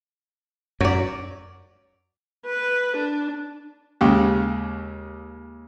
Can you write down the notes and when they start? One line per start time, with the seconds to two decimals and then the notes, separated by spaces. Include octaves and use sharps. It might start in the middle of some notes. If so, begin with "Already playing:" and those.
0.81 F#2 F#3 D5
2.45 B4
2.96 D4
4.01 D#2 C#3 G#3 G4